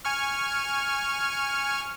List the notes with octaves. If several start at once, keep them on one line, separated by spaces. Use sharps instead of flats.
G#5 C#6 F6